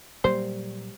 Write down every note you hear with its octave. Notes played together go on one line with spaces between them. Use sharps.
A#2 F#3 G3 A#3 C5